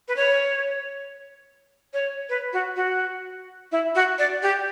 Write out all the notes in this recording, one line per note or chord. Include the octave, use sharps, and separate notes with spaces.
B4
C#5
C#5
B4
F#4
F#4
E4
F#4
D5
G4